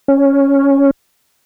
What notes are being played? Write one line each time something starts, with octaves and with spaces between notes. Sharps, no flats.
C#4